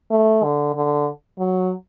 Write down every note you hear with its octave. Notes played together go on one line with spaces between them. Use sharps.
A3
D3
D3
F#3